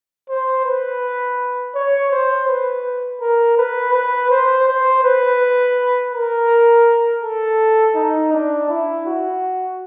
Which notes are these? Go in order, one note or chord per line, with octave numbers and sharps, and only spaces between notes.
C5
B4
C#5
C5
B4
A#4
B4
B4
C5
C5
B4
A#4
A4
D#4
D4
E4
F#4